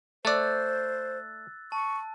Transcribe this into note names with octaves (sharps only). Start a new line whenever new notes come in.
A3 C5 D5 E6 F#6 A6
A5 C#6